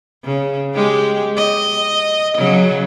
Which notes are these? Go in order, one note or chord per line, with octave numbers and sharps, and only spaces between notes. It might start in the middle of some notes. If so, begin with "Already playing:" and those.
C#3
G#3 G4
D#5
C#3 F#3